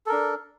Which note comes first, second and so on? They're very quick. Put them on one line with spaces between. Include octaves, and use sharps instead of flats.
A4 A#4 D4